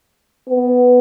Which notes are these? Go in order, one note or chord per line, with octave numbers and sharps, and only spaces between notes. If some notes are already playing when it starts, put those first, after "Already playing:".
B3